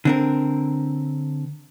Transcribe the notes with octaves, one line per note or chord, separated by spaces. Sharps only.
D3 C4 A#4